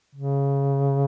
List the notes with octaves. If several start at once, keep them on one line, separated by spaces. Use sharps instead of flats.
C#3